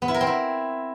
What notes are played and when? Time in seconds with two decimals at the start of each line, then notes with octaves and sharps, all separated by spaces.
0.02 B3
0.08 E4
0.14 A#4
0.21 C4
0.27 E4